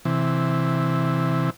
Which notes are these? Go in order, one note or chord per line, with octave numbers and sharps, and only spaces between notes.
C3 E3